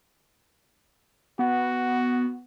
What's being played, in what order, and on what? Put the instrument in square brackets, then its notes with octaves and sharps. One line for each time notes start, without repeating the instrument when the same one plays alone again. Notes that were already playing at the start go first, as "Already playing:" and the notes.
[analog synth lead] B3 [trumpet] F#4